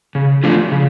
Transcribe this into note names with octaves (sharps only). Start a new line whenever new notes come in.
C#3
F3 A3 D4 F4
C#3